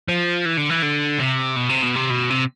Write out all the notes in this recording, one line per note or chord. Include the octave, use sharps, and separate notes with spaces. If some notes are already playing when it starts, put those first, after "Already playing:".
F3
E3
D3
E3
D3
C3
B2
C3
B2
C3
B2
C3